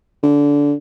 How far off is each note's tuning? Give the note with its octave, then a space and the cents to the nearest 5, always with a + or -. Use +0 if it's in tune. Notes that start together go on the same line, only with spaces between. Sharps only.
D3 -20